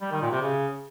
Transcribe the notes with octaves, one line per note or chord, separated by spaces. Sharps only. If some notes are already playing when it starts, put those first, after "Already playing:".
G3
D#3
A#2
C3
C#3